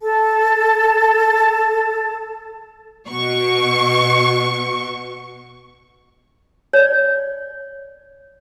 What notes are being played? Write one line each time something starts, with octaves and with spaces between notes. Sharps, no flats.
A4 A5
B2 C#6
C#5 D5